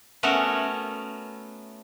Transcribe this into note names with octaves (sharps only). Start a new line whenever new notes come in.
A3 B3 C#4 F#4 A#4 E5